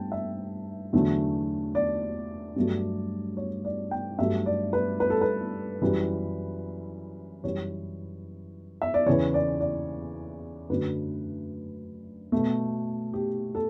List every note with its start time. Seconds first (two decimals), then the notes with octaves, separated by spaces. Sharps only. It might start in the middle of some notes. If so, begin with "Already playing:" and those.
Already playing: G2 A3 G5 A5
0.12 E5
0.93 E2 D3 F#3 A3
1.75 D5
2.56 G2 F#3 A3
3.37 C#5
3.65 D5
3.91 G5
4.19 G2 F#3 A3 E5
4.46 D5
4.73 B4
5.00 B4
5.10 A4
5.21 B4
5.82 F#2 E3 G3
7.44 F#2 E3 G3 C#5
8.82 E5
8.94 D5
9.06 E2 C#3 E3 C#5
9.34 D5
9.61 D5
10.70 F#2 D3 F#3 A3 B4
12.32 B2 A3
13.14 G4
13.55 A4